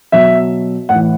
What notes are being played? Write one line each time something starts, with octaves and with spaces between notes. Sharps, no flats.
B2 F#3 E5
A2 E3 F#5